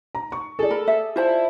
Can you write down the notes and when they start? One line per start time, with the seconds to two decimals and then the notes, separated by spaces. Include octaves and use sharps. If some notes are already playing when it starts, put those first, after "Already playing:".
0.15 A#5
0.32 C#6
0.59 G#4 A4 D5
0.71 A#4 B5
0.88 E5
1.16 E4 F4 C5 A5